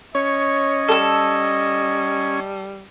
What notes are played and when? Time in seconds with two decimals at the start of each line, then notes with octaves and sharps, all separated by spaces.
0.15 C#4 C#5 D#5
0.88 G3 A4 E6